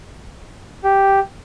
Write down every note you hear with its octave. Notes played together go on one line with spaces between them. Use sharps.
G4